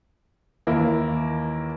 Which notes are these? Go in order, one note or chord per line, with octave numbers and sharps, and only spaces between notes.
D#2 E3 A#3 E4